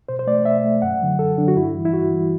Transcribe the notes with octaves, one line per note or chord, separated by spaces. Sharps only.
B2 C5
C5
A3 D5
B2 E5
A3
F#2 F#5
D3 F#3
F#2 A4
D3 F#3 D4
F#4
G2 E4
E3 G3
E4
G2 F#4
E3 G3